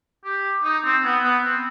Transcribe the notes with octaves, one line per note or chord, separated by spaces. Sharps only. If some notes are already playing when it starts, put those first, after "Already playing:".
G4
D#4
C4
B3
B3
C4